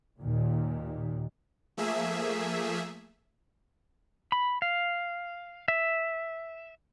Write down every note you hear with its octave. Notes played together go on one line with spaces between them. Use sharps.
D#2 A#2 D#3
F3 A3 A#3 G#4 E5
B5
F5
E5